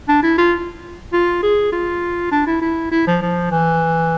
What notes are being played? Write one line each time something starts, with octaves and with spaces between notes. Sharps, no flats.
D4
E4
F4
F4
G#4
F4
D4
E4
E4
E4
F3
F3
E3